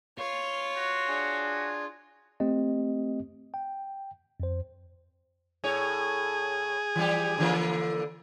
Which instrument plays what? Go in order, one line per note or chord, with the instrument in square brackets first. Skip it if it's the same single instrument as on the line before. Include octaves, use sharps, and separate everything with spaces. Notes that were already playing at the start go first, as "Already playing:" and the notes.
[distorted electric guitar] F4 [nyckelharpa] C#5
[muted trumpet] F#4
[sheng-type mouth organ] D4 G#4 G#5
[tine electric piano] A3 C4 G4 D#5
G5
F2 C5
[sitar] A2 C#5 [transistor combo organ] G#4
[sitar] E3 G3 G4
D3 E3 A#3